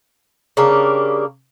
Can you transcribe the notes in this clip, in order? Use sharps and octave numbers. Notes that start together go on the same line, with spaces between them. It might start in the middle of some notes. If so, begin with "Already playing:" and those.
C#3 G3 A#3 D4